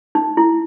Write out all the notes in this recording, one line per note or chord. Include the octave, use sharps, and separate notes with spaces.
D#4
E4